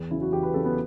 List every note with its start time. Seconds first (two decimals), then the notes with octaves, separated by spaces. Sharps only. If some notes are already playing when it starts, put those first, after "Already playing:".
Already playing: E2
0.10 C#3 F#3 E4
0.21 F#4
0.32 E2 G4
0.43 B4
0.54 C#3 F#3 A4
0.65 B3